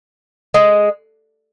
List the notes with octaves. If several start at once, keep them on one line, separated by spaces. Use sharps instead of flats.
G#3